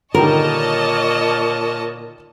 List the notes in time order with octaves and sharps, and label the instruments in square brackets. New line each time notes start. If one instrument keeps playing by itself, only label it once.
[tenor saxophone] A#2 [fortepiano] D3 D#3 G3 [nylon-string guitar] A#4 [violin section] C#5 D#5 A5